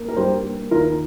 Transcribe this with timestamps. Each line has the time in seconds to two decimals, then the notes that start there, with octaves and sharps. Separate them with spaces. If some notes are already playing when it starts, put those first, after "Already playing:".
Already playing: A#3
0.09 A#4
0.17 G2 G4 C5
0.43 A#3
0.71 D#2 F4 A#4